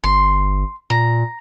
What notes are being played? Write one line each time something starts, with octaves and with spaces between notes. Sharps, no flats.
G1 C6
A#2 A#5